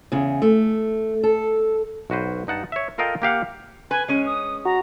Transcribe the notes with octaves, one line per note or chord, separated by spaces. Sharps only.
E2 C#3
A3
A4
B1 F#4 B4 C5
G2 D#4 F#5 A5
C#5 E5
F4 A4 A#4 D#5 F5 G5
A#3 G4 F5 F#5
B4 G#5
G#3 C#4 D#7
D#6
F#4 A#5